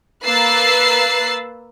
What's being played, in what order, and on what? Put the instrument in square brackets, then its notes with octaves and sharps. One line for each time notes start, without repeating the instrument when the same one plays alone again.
[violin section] A#3 B4 E6 F#6 A6 C7